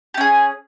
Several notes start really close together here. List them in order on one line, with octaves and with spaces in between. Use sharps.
G4 C#4 G#4